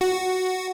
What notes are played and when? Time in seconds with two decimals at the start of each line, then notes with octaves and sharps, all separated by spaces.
0.01 F#4